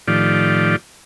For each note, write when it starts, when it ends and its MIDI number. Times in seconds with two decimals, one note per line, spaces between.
0.08 0.76 45
0.08 0.76 51
0.08 0.76 53
0.08 0.76 65
0.08 0.76 67
0.08 0.76 74